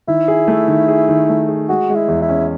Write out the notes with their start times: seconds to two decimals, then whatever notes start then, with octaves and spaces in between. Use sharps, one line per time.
0.08 D#3 E4
0.28 G#4
0.48 A3
0.68 D#3
0.88 G#4
1.09 D#3
1.29 A3
1.48 G#4
1.69 G#3 F#4
1.89 G#3
1.95 E4
2.08 E2
2.22 E4
2.29 C#4